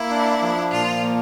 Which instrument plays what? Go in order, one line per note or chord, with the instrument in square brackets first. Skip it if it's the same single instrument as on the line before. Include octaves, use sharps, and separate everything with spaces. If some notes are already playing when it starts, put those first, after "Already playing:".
Already playing: [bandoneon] A#3 [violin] E4
[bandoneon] D4
F3
[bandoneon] A#2 [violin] F4
[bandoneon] A#3